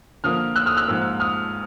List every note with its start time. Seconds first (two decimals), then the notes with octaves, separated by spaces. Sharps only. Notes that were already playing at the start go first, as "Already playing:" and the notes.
0.24 D3 F3 A#3 D#6 F6
0.56 E6 F#6
0.66 D#6 F6
0.77 E6 F#6
0.87 G#2 F3 A#3
1.20 D#6 F6